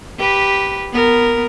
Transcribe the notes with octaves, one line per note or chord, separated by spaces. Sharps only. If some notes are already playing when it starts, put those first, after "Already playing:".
G4 B4
B3 A#4